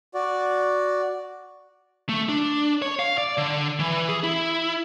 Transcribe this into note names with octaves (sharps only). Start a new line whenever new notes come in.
F#4 D5
A3
D4
C#5
F5
D5
D3
E3
G#4
E4